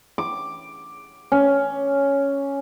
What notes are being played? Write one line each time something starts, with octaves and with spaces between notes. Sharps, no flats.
D6
C#4